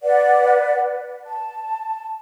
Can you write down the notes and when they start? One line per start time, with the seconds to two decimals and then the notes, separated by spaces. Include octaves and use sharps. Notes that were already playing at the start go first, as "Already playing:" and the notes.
0.03 B4 D5 F#5
1.23 A5